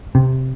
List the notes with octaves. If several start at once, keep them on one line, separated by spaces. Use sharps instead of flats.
C3